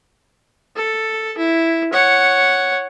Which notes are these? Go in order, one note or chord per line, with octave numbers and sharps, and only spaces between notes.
A4
E4
C#5 F#5